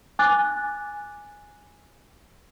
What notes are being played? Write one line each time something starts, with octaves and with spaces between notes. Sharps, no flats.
G#5 D6 F#6 A6